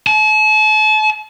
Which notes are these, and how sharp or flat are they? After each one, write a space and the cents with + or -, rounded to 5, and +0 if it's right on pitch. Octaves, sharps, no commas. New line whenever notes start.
A5 -40